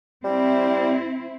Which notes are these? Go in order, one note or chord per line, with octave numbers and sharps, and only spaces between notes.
G3 C4 E4